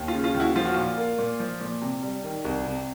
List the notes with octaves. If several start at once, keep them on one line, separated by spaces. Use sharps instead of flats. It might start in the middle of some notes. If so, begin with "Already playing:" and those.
Already playing: D#2
F4
C#3
F4
D#2
E4 F#4
F3 F4
F#4
A#2 F4
A#3
A#2
F3
A#2
C3
G3
D#3
C2
C3